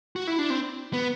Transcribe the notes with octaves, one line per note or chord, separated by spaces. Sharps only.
F#4
E4
D4
C4
B3